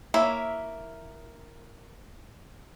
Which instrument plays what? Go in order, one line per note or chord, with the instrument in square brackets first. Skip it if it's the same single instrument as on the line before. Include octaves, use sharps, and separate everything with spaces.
[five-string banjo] A#3 E4 C#5 E5